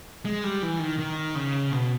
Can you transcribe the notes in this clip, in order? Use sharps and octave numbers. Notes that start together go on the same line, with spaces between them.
G#3
G3
E3
D#3
D#3
C#3
B2